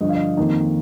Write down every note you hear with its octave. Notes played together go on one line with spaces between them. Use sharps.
G2 D3 F3 D#5
F5
D#5
F2 D#3 A#3 D#4